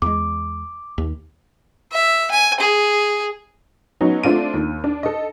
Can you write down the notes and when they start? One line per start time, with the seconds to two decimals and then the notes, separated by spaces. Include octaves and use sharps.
0.02 E2 G#3 D6
0.98 D#2
1.93 E5
2.31 G#5
2.61 G#4
4.01 F#3 B3 C#4 D#4
4.24 A3 C4 D4 F4 D#7
4.54 D#2
4.84 D4
5.03 A4 D#5